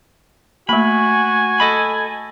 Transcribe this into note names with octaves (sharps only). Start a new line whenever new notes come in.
A3 A#3 F#4 G#5 B5
A4 D#5 B5